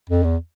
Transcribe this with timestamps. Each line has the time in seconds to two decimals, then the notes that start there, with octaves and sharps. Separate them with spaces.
0.10 F2
0.24 E2